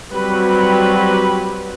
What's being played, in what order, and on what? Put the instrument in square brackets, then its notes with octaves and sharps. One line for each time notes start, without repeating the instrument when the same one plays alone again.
[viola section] F#3 G3 C4 F#4 G4 B4